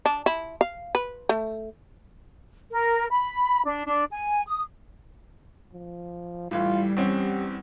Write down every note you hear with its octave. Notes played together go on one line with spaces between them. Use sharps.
D4
E4
F5
B4
A3
A#4
B5
D4
D4
G#5
D#6
F3
A2 E3 G3 F4
E2 C4 C#4 G4